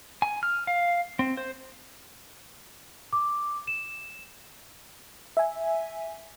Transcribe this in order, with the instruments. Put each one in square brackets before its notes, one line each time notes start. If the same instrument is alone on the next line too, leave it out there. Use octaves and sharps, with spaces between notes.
[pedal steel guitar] G#5
F6
F5
C4
C5
[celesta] D6
E7
[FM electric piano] E5 G#5